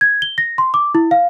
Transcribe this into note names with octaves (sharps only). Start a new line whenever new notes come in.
G#6
G7
A#6
C6
D6
E4
F5